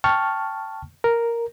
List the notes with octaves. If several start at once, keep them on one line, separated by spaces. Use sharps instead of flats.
G5 A5 C#6 F6
A#4